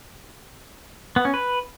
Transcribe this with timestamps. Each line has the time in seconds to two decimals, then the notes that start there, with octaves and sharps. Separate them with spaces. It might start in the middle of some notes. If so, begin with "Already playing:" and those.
1.16 B3
1.25 C#4
1.34 B4